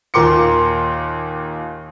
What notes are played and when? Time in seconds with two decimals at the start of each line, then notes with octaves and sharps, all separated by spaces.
0.14 D#2 A#2 A#4 C6 D6 C#7